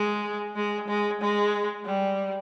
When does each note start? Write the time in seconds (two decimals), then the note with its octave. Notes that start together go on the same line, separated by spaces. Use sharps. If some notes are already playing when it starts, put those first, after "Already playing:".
Already playing: G#3
0.56 G#3
0.88 G#3
1.21 G#3
1.86 G3